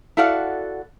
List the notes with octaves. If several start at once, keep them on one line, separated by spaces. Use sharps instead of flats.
E4 F#4 A4 D5 F5 F#5